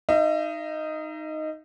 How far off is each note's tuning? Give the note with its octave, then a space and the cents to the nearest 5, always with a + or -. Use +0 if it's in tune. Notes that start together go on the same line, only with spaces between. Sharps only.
D#4 +0 E5 +40